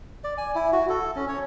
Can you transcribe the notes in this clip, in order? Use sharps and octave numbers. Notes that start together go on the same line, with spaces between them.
D5
G#5
E4
F#4
A4
C#4
C#5